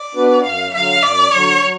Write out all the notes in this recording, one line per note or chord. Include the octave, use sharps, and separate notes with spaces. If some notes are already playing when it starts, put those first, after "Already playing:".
Already playing: D5
B3 D4 F#4 B4
F#2 F5
D3 F#3 F5
F#2 D5
D3 F#3 C#5
F#3